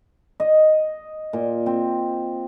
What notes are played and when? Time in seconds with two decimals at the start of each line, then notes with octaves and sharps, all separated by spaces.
0.40 D#5
1.33 A#2
1.66 C4